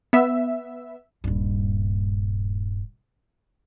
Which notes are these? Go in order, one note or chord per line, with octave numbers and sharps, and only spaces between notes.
B3 E5
D#1 G2